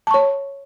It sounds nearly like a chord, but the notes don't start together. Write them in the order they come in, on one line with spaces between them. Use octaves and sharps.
A5 C#6 C#5